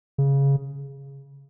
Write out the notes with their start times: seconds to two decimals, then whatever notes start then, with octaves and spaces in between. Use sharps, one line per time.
0.18 C#3